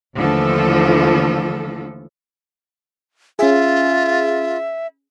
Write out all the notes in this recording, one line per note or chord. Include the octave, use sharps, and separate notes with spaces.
D#2 D3 E3 F3 A3 A4
C#4 F4 G#4 E5